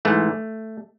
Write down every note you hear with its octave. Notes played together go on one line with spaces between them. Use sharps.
G#2 E3 A3